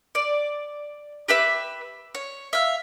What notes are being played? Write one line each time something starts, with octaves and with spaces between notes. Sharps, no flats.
D5
G4 B4 E5 D6
C#5
E5 F5